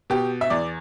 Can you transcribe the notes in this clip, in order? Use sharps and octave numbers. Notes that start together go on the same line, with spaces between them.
B2 G4
E5
E2 D5